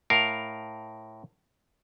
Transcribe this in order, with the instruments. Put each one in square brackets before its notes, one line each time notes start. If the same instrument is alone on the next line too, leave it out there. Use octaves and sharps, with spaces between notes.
[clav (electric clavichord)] A2 A#4 F5